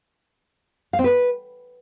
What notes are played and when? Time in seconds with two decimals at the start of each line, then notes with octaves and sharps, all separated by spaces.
0.93 F5
0.99 C4
1.04 B4